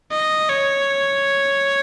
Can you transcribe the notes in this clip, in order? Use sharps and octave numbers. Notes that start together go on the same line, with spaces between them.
D#5
C#5